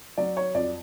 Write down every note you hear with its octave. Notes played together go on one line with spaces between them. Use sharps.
F#3 D5
C#5
F2 D5